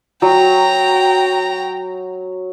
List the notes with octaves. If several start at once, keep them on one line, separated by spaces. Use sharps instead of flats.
F#3 G5 A#5